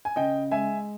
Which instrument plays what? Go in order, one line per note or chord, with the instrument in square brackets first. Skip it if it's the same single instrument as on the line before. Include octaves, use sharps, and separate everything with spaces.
[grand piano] G#5
C#3 D#5 G5
G#3 E5 G#5